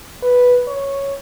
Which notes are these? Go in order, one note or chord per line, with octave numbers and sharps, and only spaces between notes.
B4
C#5